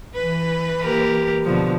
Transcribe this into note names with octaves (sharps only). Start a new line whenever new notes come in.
E3 B4
A#3 G4 A#4
B2 D3 F3